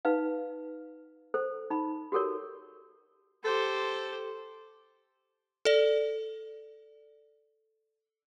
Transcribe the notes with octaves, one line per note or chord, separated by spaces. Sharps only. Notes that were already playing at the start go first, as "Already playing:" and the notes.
D#4 B4 F5
A4 C5
D#4 B5
F#4 G4 A4 A#4 C#5
G4 A4 C5
A4 D5